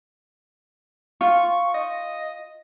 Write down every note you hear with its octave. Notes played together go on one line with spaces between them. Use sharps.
F4 C#6
D#5